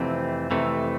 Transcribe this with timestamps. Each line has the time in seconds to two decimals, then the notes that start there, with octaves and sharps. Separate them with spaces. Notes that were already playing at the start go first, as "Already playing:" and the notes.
Already playing: F2 C3 E3 A3 C4
0.51 F2 C3 E3 A3